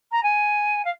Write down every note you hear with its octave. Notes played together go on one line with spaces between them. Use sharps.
A#5
G#5
F5